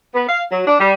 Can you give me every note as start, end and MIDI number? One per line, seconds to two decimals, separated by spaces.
0.14 0.26 59
0.28 0.43 77
0.51 0.65 54
0.67 0.77 62
0.79 0.93 55